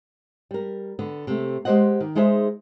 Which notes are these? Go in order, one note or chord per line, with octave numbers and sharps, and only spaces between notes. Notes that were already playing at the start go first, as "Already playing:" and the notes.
G3 A#4
D3 B3
C3 A3
G#3 G4 G#4 C5 D#5 F#5
D#3
G#3 D#4 E4 G#4 C5 E5